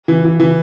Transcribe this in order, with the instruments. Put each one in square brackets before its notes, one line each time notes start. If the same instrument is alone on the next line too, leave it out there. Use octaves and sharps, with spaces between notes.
[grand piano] E3
E3
E3